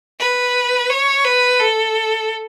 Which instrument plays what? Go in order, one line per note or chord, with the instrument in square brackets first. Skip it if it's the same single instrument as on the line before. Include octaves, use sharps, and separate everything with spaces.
[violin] B4
C#5
B4
A4